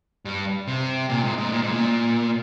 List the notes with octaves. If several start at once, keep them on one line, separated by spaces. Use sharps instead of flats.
G2
C3
A#2
G#2
G#2
A#2
G#2
A#2